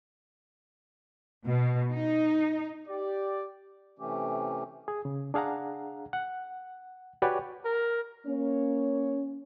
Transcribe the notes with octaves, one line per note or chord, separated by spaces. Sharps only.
B2
D#4
G4 D5
C3 E3 A3 C#4 G4
G#4
C#3
D4 G#4 F5 F#5 A#5
F#5
F#4 G4 B4 C#5 D5 G#5
A#4
A#3 C#4 C#5